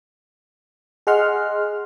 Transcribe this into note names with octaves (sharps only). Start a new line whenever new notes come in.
G#4 D#5 F#5 C6 F6